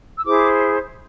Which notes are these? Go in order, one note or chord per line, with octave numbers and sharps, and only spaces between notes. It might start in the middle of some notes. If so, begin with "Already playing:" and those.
E6
E4 G#4 C5 D6